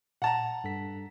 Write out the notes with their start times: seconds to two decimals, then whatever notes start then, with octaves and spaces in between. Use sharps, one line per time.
0.22 A#2 F#5 A5 A#5
0.64 G2 A4 B6